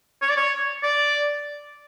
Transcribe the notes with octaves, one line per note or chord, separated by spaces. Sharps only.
C#5
D5
C#5
D5